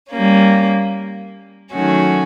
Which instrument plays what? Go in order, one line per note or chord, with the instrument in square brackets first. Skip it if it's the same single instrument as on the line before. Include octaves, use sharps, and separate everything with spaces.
[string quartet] G3 A#3 C#4
D#3 F#3 A3 C#4 F#4